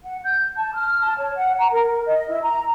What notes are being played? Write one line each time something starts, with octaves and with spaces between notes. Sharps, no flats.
F#5
G6
A5
F6
A5
C#5
F#5
A#5
A#4
D#5
E4
A#5